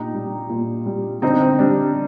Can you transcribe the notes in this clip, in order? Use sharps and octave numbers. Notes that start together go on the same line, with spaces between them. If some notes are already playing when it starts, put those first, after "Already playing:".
Already playing: A#2 D#4 G4
G3
A#2
G3
D3 C4 D#4
C4
G3 D4